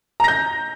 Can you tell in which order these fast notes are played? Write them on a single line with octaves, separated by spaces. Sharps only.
A#5 A#6 G6